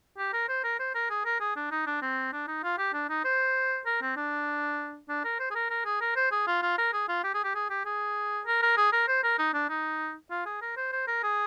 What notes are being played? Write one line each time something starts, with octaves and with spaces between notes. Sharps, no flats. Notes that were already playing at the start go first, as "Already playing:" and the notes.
G4
A#4
C5
A#4
C5
A#4
G#4
A#4
G#4
D4
D#4
D4
C4
D4
D#4
F4
G4
D4
D#4
C5
A#4
C4
D4
D4
A#4
C5
G#4
A#4
A#4
G#4
A#4
C5
G#4
F4
F4
A#4
G#4
F4
G4
G#4
G4
G#4
G4
G#4
A#4
A#4
G#4
A#4
C5
A#4
D#4
D4
D#4
F4
G#4
A#4
C5
C5
A#4
G#4